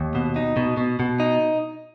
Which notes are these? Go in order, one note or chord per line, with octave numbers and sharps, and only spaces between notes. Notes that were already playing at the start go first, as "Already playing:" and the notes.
Already playing: D#2
B2
D#4
B2
B2
B2
D#4